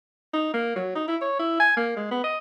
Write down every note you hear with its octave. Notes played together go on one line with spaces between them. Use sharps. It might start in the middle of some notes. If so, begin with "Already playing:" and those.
D#4
A#3
F#3
D#4
E4
C#5
E4
G#5
A#3
G#3
B3
D#5